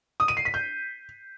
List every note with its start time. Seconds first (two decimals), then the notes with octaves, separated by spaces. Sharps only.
0.20 D#6
0.28 D#7
0.37 C7
0.45 B6
0.54 G6